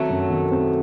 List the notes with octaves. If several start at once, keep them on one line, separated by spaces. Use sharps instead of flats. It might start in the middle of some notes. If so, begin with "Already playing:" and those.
Already playing: D#3 F#3 A3 C4
F#2
D#3
C4